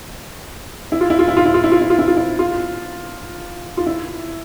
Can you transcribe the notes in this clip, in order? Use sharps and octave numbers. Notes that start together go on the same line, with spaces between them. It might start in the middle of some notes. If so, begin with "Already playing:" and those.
E4
F4
E4
F4
E4
F4
E4
F4
E4
F4
E4
F4
E4
F4
E4
F4
F4
E4